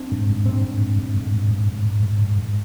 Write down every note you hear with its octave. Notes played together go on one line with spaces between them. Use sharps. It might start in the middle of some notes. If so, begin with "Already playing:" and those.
Already playing: C4 D4
G#2
G#2
G#2 C4 D4
G#2
G#2
G#2
G#2
G#2
G#2
G#2
G#2
G#2
G#2
G#2